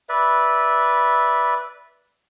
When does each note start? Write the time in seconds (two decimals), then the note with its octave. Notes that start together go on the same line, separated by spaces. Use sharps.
0.09 B4 D5 E5